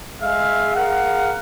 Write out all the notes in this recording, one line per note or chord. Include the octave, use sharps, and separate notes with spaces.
G#3 G#4 E5 F5
G#4 A#4 F5 F#5